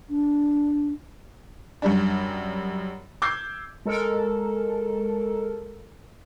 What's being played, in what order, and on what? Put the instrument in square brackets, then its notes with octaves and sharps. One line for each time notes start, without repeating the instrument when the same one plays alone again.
[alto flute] D4
[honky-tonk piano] F#2 G3 D4
D6 E6 G6 G#6 C7
[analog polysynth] G#3 A4 A#4